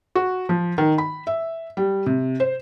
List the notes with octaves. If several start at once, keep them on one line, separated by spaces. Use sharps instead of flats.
F#4
F3
D#3
B5
E5
G3
C3
C5